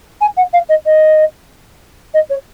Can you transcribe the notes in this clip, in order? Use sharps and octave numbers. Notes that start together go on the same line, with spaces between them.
G#5
F#5
F5
D#5
D#5
D#5
C#5